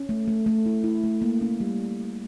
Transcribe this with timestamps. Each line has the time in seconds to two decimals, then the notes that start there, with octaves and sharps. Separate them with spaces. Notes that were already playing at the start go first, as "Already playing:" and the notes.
Already playing: C#4
0.09 A3
0.28 A3
0.46 A3
0.66 E4
0.84 E4
1.04 A3
1.22 A#3
1.41 C#4
1.60 G3